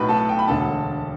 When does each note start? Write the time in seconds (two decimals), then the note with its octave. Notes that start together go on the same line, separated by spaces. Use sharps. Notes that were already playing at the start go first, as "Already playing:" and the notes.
Already playing: B1 A2 F#3 B4 B5
0.09 A4 A5
0.29 G5
0.39 B5
0.48 E1 D2 D3 A4 A5